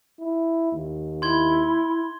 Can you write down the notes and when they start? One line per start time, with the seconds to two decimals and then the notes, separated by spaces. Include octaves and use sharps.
0.19 E4
0.72 D#2
1.22 E4 C6 G#6 G7